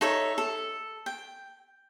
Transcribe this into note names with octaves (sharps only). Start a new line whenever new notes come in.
D#4 A4 C#5 E5
A4
G5